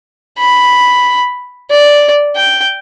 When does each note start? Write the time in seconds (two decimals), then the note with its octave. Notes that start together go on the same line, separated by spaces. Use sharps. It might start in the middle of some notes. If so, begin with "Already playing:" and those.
0.38 B5
1.70 D5
2.36 G5